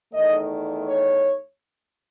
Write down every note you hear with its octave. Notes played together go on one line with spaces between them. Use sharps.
E2 D#3 A3 D#5
C#5